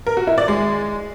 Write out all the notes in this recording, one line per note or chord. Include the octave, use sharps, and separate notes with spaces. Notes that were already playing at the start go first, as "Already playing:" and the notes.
A#4
F#4
E4
D5
G#3